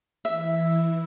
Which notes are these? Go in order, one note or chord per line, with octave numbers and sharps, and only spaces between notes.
E3 E4 E5